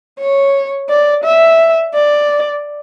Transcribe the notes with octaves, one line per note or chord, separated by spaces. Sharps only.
C#5
D5
E5
D5